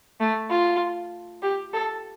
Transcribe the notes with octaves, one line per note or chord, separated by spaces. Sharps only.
A3
F4
G4
A4